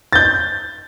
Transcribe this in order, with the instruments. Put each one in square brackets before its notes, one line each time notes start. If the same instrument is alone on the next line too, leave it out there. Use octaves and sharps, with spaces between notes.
[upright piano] G6 A6